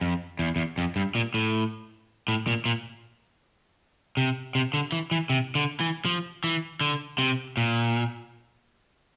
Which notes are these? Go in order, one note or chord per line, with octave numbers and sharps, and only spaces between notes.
F2
E2
E2
F2
G2
A#2
A2
A2
A#2
A#2
C3
C3
D3
E3
E3
C3
D3
E3
F3
E3
D3
C3
A#2